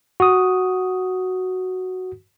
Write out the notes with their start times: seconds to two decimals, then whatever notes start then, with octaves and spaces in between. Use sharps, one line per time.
0.20 F#4 D#6